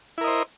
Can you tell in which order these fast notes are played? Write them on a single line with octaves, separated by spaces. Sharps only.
E4 A#4 D#5 C5